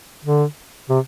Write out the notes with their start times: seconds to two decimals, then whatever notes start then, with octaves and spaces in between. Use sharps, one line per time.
0.25 D3
0.89 C3